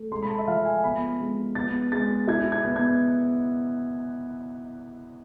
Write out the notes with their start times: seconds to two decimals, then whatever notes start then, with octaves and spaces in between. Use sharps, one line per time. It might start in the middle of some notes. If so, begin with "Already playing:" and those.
Already playing: A3
0.11 G#3 C6
0.22 B5
0.30 A5
0.38 E5
0.47 F3 F5
0.65 G#5
0.83 B3 B5
1.20 G#3
1.55 B3 A6
1.92 G#3 A6
2.27 E4 G#6
2.52 G#6
2.64 B3
2.76 G#6